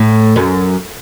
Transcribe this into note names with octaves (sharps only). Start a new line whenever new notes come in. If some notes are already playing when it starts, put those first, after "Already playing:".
Already playing: A2
F#2